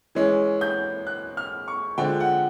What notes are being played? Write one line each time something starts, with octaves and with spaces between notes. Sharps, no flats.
E3 G#3 C#4
G6
F#6
F6
C#6
D3 F3 G#3 G5
F#5